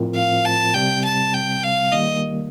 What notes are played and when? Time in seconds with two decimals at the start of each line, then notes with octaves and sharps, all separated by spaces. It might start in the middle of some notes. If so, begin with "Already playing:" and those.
Already playing: A2 F3 C4 F4 A#4
0.15 F5
0.45 A5
0.74 C3 G3 C4 G5
1.04 A5
1.34 G5
1.63 F5
1.93 D#3 G3 A#3 D#5